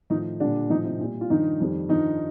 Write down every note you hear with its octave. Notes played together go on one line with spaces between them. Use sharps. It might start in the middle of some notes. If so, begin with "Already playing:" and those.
A2 D#3 F3 D#4
A#2 D3 G3 D4
A2 D#3 F3 D#4
C3 C4
A#2 G3
F4
G2 D#3 F3 D#4
F2 D#3 G3
G2 D#3 F3 D#4